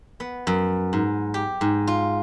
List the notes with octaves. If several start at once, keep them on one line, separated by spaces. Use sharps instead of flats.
B3
F#2
G#2
G4
G#2
F4